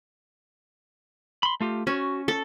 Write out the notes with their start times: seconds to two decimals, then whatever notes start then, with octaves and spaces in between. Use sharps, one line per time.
1.43 B5 C6
1.61 A3 F4 G4
1.87 C#4 F#4
2.28 A4